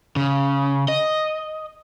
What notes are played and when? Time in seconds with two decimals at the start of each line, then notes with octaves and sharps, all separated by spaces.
0.16 C#3
0.88 D#5